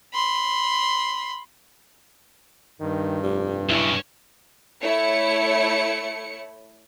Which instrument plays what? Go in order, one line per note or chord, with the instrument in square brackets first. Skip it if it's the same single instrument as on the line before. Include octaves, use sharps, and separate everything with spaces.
[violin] B5 C6
[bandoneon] G2 [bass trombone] D#3
[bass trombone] F1 [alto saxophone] G3
[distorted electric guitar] B1 C#3 [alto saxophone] E4
[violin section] A3 E4 C#5 C#7